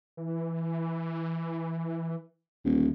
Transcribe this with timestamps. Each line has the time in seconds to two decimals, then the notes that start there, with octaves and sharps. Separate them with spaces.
0.17 E3
2.65 D#1 D2